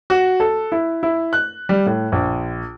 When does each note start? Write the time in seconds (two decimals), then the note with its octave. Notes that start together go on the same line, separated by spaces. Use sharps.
0.10 F#4
0.40 A4
0.72 E4
1.03 E4
1.33 F#6
1.69 G3
1.86 A2
2.12 A#1